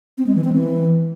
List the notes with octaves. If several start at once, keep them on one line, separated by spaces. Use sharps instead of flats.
C4
G#3
E3
C4
E3